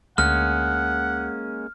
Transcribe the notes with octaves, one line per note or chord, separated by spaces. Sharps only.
D2 G#3 A#3 C#4 F#5 F6